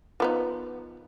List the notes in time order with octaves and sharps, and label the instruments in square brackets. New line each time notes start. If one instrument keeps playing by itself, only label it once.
[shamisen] F3 B3 D#4